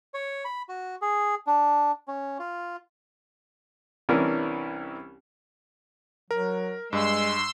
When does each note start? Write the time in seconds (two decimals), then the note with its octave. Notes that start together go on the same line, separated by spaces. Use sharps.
0.14 C#5
0.45 B5
0.69 F#4
1.02 G#4
1.47 D4
2.08 C#4
2.39 F4
4.09 C2 E3 C#4 D4 A#4
6.31 F#3 A#4
6.93 G2 G#3 C6 E6